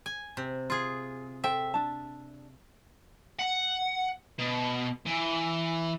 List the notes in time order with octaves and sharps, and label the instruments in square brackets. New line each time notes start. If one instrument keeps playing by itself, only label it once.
[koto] G#5
C3
F4 G#4
[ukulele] A4 C5 G5 [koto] E5
[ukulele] D4 A5
[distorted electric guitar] F#5
B2
E3